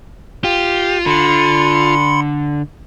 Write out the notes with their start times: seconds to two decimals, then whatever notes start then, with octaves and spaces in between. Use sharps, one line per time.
0.44 F4 G4
1.06 D3 B5 C6 C#7